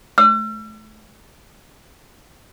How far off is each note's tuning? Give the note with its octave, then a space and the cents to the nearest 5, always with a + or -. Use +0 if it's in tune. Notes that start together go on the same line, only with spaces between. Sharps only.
E6 +40